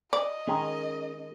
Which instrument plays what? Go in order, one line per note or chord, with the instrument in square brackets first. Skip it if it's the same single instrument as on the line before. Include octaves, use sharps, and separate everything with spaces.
[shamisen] D5 [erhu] D#5
[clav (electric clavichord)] D#3 G#3 [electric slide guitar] C#4 G#4 A#4